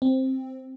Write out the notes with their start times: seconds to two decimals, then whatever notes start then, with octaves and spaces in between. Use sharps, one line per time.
0.02 C4